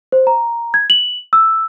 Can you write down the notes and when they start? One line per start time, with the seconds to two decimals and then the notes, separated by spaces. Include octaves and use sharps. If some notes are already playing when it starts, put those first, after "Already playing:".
0.12 C5
0.27 A#5
0.74 G#6
0.90 F#7
1.33 E6